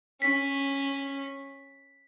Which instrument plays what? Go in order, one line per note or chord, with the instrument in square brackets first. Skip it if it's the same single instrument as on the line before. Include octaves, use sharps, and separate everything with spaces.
[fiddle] C#4 [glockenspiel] B6